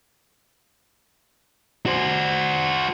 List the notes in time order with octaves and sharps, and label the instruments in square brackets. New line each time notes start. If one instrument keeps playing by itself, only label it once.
[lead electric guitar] F#4 C5